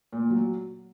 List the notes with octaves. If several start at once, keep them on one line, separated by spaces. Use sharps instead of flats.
A#2
F#3